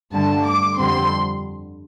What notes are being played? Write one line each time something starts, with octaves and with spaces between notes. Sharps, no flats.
G2 D3 A3 A5
D6
F2 D3 G3 C4 C6